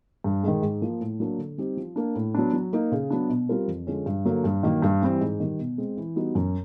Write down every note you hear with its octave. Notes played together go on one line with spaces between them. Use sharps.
G2
D#3 G#3
G#2
F3 A#3
A2
F#3 A#3 D4
D3
G3 C4 D#4 G4
F3
A#3 D4
A2
F#3 B3 D4
F#3
A#3 D#4
C#3
F#3 B3 D4
B2
G3 C4 F4 A#4
F2
D3 F3 G#3 C#4
G2
D3 F#3 A#3
G2
D#3 F#3 A#3
G2
E3 G3 C4
G#2
D#3 G3
B2
G#3 C4
E3
G3 B3 D#4 F#4
F#2